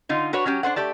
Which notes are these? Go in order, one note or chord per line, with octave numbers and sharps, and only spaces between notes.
D3 D#4 F4
D4 F#4 B4 C#5
F#3 C#4 G4
D4 A4 C5 F#5
A3 G4 D5 A5